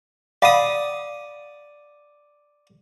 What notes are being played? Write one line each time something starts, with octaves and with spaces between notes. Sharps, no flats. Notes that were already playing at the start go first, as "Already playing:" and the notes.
D5 F5 F#5 B5 D#6